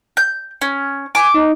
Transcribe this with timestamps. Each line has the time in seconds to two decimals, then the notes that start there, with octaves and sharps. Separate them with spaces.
0.17 G6
0.62 C#4
1.15 G#5 D6
1.34 D#4